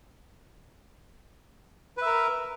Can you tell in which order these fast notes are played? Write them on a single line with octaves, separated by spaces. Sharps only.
B4 E5 A#4